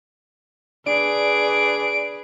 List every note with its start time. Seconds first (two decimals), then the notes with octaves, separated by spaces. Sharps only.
0.86 D4 G#4 B4 D7